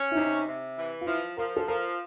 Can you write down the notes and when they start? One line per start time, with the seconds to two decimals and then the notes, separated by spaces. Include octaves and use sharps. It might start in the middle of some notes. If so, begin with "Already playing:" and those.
Already playing: C#4
0.11 E4
0.15 C3 D#4
0.46 C3
0.77 E3
1.01 F4
1.07 F3 E4
1.37 F3 A#4
1.57 A4
1.68 F3 A#4